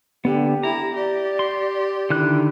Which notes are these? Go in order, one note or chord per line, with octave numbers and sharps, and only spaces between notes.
D3 B3 G4
E4 A#5
G4 D5
C6
D3 D#3 E4 F#6